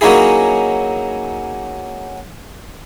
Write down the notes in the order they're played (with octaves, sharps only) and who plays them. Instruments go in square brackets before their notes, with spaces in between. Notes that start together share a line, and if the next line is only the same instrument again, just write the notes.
[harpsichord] F#3 A#3 C#4 D#4 E4 G#4